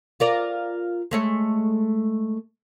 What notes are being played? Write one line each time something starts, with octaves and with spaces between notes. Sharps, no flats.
F4 A#4 D5
G#3 A3 C#5